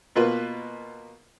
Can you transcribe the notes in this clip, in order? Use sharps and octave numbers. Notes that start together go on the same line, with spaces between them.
B2 A#3 F4 B4